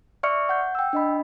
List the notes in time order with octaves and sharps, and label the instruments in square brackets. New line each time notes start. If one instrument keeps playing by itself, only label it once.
[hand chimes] D5 E5 C#6 F6 C#7
F#5 G6
G5 E6
D4 D#5 B5